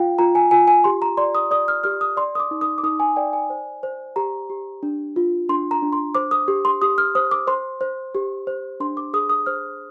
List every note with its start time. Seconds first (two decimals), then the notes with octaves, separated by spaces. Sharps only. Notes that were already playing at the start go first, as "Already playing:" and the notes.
Already playing: F4 F5 G5
0.19 F4 A#5
0.35 G#5
0.51 F4 G#5
0.68 G#5
0.84 G4 C6
1.02 A#5
1.17 D5 C6
1.35 D#6
1.51 D5 D#6
1.68 F6
1.84 G4 F6
2.01 D#6
2.17 D5 C6
2.35 D#6
2.40 D6
2.51 D#4
2.61 D#6
2.78 D6
2.83 D#4 D#6
3.00 G#5
3.16 D5 G5
3.33 G#5
3.50 C5
3.83 C5
4.16 G4 A#5
4.50 G4
4.83 D4
5.16 F4
5.49 D4 C6
5.71 A#5
5.82 D4
5.93 C6
6.15 C5 D6
6.31 D#6
6.48 G4
6.65 C6
6.82 G4 D#6
6.98 F6
7.15 C5 D#6
7.31 D6
7.47 C5 C6
7.81 C5
8.15 G4
8.47 C5
8.80 D4 C6
8.97 D6
9.14 G#4 D#6
9.30 D#6
9.46 C5 F6